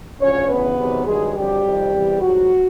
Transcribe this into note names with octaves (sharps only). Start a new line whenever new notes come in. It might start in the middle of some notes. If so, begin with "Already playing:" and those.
D2 C#3 F3 C#4 C#5
D2 C#3 E3 B3 B4
E2 C3 D#3 F#3
G2 D#3 F#3 G#3 G#4
F2 D3 F#3 G3 G4
F2 C3 D#3
E2 C3 E3
G#2 F3 F#3 F#4